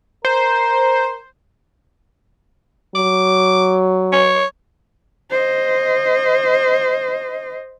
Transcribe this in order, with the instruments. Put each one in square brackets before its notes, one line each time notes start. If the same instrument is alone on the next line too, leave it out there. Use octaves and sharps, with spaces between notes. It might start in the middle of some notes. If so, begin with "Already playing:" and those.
[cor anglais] A#4 [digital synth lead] C5
[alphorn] F#3 [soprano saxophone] D6
[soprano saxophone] C#5
[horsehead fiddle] C5 D#5